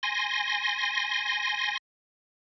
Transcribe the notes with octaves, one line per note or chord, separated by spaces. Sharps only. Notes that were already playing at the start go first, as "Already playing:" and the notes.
G#5 C6 A#6